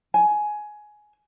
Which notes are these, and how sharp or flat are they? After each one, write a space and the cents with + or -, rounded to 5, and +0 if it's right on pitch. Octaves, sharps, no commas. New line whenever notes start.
G#5 +15